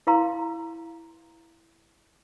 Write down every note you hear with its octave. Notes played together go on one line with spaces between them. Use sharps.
E4 B4 F5 A#5 C6